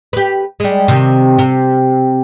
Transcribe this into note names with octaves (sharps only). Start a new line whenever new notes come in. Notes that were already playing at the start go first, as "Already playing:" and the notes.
G4 B4
G3 G#3
C3 D#3
C3